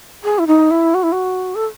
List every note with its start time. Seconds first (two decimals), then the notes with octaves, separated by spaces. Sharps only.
0.24 G#4
0.39 E4
0.47 D#4
0.71 E4
0.94 F#4
1.03 E4
1.12 F#4
1.55 A4